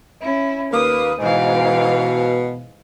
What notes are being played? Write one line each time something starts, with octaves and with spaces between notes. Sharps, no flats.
C#4 E4
D#2 A#3 B4 D#6
G#2 B2 E3 F5